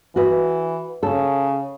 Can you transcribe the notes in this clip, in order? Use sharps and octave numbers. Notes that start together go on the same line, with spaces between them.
E3 F#4 B4
C#3 A4